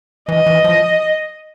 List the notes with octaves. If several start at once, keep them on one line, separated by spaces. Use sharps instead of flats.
E3 D#5
E3
F3